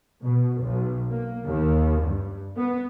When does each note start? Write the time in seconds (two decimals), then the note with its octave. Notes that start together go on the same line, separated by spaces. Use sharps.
0.22 B2
0.60 B1
1.10 A#3
1.46 D#2
2.02 G2
2.57 B3